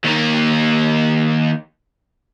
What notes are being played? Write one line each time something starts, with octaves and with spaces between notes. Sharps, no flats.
D#2 A#3